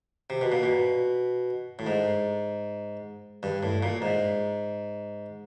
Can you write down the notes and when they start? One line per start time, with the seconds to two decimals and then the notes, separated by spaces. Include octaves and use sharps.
0.30 C3
0.41 B2
0.52 A#2
0.63 B2
1.79 A2
1.87 G#2
3.43 G2
3.63 A2
3.83 A#2
4.02 G#2